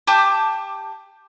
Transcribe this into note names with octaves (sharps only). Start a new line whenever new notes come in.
G4 A5 D6 G6